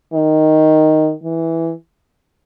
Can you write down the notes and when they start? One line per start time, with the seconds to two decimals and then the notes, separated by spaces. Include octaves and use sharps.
0.14 D#3
1.23 E3